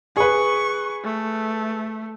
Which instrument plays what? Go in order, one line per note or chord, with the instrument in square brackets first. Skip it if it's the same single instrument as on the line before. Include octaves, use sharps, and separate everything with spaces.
[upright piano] G#4 B4 [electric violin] C#6
[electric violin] A3